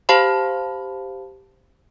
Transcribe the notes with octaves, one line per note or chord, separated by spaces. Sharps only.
G4 C5 F5 A5 B5